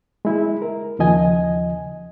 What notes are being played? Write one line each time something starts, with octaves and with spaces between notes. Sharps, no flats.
G#3 E4
A#4
D#2 C#3 F3 D#5 G#5